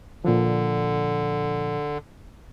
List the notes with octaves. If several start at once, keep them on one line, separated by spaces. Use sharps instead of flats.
A#2 D3 F3